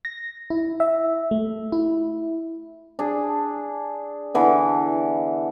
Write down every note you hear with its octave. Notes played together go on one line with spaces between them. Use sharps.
A#6
E4
E5
A3
E4
D4 G#4
D3 E3 B3